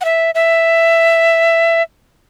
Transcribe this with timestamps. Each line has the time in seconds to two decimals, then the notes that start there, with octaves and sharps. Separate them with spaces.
0.01 F#5
0.05 E5
0.35 E5